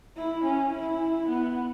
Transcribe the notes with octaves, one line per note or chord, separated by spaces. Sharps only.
E4
C#4
E4
B3